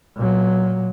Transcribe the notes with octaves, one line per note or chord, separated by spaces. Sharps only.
A#2 F#3